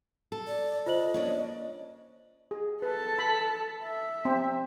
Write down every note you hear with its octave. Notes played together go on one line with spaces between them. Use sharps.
A4
D5
F4 C5 D#5 F#7
A#3 C#4 D4
G#4
A4 B4 A5
B5
E5
C4